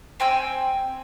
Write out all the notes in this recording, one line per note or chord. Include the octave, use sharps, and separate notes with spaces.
C4 G5 G#5 E6